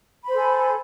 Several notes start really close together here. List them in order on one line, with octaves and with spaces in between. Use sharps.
B5 C5 A4 G#5